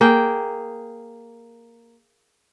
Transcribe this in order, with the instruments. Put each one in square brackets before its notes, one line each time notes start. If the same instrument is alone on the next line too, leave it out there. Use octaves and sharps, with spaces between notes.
[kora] A#3 G#4 G5